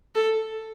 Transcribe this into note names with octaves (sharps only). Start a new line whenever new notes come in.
A4